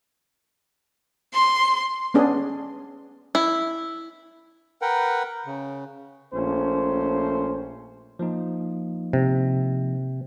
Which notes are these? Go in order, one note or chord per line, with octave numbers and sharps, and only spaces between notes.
C6
B3 C#4 D4 G#4
E4
A#4 B4 F#5 G5
C#3
A#1 A3 C#4 C5
F3 A#3 D#4
C3